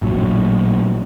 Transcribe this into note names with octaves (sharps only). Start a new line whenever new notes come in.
A1 A#2 F#3